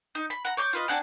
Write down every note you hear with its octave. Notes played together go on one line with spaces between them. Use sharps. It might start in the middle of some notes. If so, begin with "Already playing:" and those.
D#4
B5
F#5 A#5
C#5 D6 G6
F4 B4 D#5
C4 D4 F#5 G#5